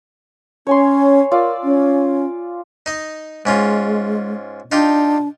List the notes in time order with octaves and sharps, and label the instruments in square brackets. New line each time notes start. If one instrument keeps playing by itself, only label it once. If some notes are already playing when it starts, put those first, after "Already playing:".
[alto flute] C#4 [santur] C#5 G#5 C6
[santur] F4 D5 E6 [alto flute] A#4
[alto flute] C#4
[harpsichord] D#4 D#5
[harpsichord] G#2 C#4 F4 [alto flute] G#3
[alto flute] D4 [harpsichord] D#4 F4 G4